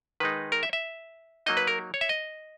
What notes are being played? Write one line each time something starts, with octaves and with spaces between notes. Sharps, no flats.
D#3 G#3 D#4 B4
A#4
E5
E5
F#3 A#3 D#4 D#5
B4
A#4
C#5
E5
D#5